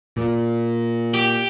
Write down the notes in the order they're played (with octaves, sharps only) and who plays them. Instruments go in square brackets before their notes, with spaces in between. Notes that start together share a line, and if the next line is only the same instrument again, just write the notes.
[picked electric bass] A#2
[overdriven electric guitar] G4